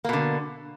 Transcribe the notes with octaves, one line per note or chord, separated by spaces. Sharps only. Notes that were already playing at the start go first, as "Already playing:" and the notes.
B2 D3 A#3